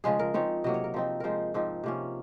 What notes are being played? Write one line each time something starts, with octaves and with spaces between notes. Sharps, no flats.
C#3 F3 G#3 G#4
A#4
F3 C4 D#4 C#5
C3 F#3 A#3 D#5
C#5
A#4
F3 C4 D#4
F3 G#3 D#4 A#4 C5
G#2 F3 C4 D#4
C3 F3 A#3 C#4